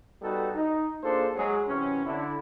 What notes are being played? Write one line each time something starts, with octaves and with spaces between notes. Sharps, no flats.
G3 B3 D#4 F#4 G4 A4
D#4
A#3 D4 F4 G#4 A4 C5
F#3 G#3 G#4
C3 E3 F#3 C#4
D3 E4